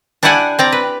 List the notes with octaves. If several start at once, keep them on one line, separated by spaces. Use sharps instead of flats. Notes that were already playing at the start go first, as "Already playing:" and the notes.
D4 E4 G4 D5 F#5 G#5
C4 D5 A#5
B4